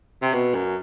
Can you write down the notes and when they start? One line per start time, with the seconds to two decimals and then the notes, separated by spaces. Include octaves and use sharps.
0.22 C3
0.34 B2
0.54 F#2